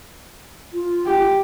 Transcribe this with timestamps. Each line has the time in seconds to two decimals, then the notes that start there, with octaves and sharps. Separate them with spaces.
0.73 F4
1.06 G4